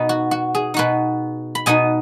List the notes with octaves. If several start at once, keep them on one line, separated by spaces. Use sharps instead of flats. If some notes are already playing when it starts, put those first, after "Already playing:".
Already playing: B2 B3 D#4 B4
F#4
F#4
G#4
B2 B3 D#4 F#4 B4
B5
B2 B3 D#4 D#5 G#5